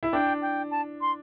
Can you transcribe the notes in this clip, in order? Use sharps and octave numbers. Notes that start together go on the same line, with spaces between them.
E4
D4 G5
G5
A5
C6